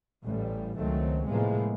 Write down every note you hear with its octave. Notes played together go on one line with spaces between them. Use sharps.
A1 A2 G3
C#2 D#3 F#3 A3 C4
A2 C3 F3 G#3 A#3 B3